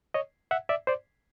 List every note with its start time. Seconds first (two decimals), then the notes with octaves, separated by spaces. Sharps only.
0.14 C#5 D#5
0.51 E5 F#5
0.69 D5 E5
0.87 C5 D5